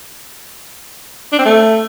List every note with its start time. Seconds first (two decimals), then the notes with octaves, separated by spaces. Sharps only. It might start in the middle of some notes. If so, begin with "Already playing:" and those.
1.32 D4
1.39 C4
1.45 A3